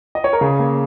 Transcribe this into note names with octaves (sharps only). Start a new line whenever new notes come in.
D#5
C#5
A#4
C#3 G#4
A#3